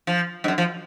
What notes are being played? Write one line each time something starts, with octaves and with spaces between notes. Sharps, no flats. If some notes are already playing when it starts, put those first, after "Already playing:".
F3
G#2
F#2
F3